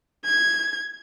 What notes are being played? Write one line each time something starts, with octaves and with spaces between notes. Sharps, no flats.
G#6